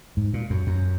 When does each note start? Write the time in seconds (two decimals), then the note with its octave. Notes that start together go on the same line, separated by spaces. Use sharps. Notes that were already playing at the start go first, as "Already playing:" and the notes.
0.17 G#2
0.34 A#2
0.50 F#2
0.67 F#2